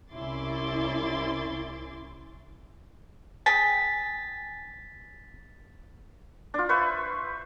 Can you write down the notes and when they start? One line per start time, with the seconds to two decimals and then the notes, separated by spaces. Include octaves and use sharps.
0.12 C2 C#4 E4 C6 D6 A6
3.46 G#4 G5 G#5 A6 B6
6.54 D4 F4
6.69 B4 C5 E5 C#6